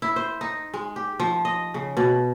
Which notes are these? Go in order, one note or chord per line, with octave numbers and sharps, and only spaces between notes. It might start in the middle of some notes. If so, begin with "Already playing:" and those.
E4
C5
D#4
G#3
G4
F3
D#5
C#3
B2